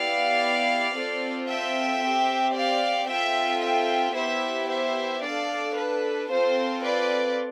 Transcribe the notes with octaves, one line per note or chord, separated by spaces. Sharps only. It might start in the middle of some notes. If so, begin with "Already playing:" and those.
Already playing: B3 E4 G4 D5 F5
C4 F4 A4
E5 G5
C4 G4
D5 F5
C4 F4 A4 E5 G5
E5 G5
B3 E4 G4 C5 E5
C5 E5
D4 A4 D5 F5
B4
C4 F4 A4 C5
B4 D5